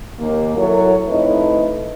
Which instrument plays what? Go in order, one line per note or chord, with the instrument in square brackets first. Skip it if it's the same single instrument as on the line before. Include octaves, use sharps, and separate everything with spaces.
[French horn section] D#2 A#3
F#3 E4 F#4 A4 A#4 C#5
F2 A3 D#4 E4 B4 D#5